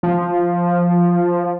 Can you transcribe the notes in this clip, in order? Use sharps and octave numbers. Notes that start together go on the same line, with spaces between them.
F3